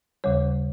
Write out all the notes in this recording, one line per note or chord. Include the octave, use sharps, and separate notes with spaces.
D#2 C#3 G3 C#5